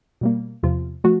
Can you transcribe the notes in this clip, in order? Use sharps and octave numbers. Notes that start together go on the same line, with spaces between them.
B2 G3 A#3
E2 C3 F3 F4
F3 A3 F#4